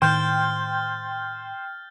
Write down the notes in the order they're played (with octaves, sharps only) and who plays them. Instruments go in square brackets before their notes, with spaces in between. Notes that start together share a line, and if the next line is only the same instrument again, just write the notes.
[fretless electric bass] A2 D#3 [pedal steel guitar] C5 [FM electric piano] G5 [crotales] F6 G6 A6